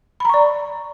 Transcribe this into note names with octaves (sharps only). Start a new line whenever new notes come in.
D5 A#5 B5 C#6